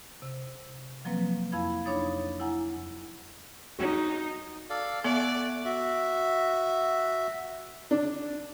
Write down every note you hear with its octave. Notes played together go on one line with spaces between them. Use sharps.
C3
F3 F#3 A#3 C4 B4
F2 E4 F5 B5 G#6
D4 D#4 C#5 B5 D#6 A6
E4 F#5 G#5 A#5
D#4 F#4
A4 D5 F5
A3 B3 D5 F#5
F#4 E5
D4